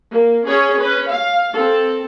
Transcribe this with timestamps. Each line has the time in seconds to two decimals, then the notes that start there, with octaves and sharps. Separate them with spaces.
0.12 A#3
0.49 C#4 G#4 C#5
0.78 C#4 B4
1.11 F5
1.56 C4 A4